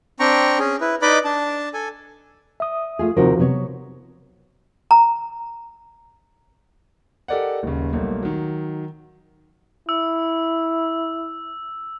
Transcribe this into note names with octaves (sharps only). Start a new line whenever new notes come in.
C4 D4 G5 A#5 C#6
C#4 G#4
E4 B4
D#4 B4 D5 D#5 B5 D6
D4 A5
A4 G#5
E5 D#6
A3 F4 G#4
D#2 C3 F3 D#4 F#4 A#4
C3 F#3 B3 C#5
A#5
G4 A4 A#4 D5 D#5 F#5
D#1 C#3
B1 G3 A3 A#3
D#3 F#3
E4 E6